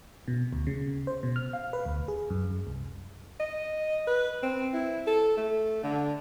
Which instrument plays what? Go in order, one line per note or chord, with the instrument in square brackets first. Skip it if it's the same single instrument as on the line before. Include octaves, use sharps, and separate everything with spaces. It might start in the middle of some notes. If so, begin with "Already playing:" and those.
[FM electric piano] B2
D2
C#3
C5
B2
F6
F5
B4
D2
G#4
F#2
C2
[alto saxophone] D#5
B4
C4
E4
A4
A3
D3